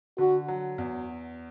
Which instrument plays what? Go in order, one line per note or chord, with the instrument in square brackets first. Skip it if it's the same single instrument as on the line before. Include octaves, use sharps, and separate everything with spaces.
[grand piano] D3 [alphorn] F#4
[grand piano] F#3
E2